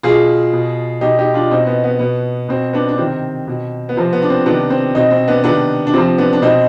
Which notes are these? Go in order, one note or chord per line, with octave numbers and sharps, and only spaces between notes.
B2 F4 G#4
B2
B2 D#4 G4
D#4 G4
D4 F4
B2 C4 D#4
B3
B3
B2 B3
B2 C4
B3 D4
D4
C3 D#3 C4
B2
B3
C3 F3 C4
B3
D4
C4
C3 D#3 B3 D4
C4
B2 C4 D#4
C4
B3 D4
C3 D#3 B3 D4
D4
C3 F3 C4
B3 D4
D4
B2 C4 D#4